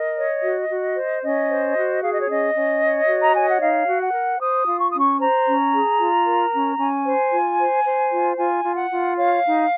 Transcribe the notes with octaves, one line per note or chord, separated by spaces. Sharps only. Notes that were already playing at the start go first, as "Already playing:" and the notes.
Already playing: A#4 D#5
C#5
F#4
F#4
C5
C#4 D#5
C5
F#4
G#4 F5
D#5
C#5
C#4 D#5
C#4
C#5
F#4
A#5
C#5 G#5
F#5
D#4 F5
F#4
F#5
A#4
C5 D#6
F4
C#6
C#4 D#6
C#6
C5 A#5
C#4
G#4
F4
A#4
C#4
C#4 G#5
C5
F4
C5
C5
F4
F4 G#5
F4
F#5
F4
C#5 F5
D#4